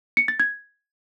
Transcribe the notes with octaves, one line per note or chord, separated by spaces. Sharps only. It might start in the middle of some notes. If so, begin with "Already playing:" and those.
C#7
A6
G#6